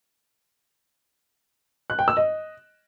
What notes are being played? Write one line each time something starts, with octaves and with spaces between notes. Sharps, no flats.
F#6
G5
E6
D#5